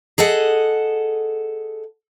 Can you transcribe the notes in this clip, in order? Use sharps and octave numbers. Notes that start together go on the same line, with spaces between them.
G#4 A4 D#5 F#5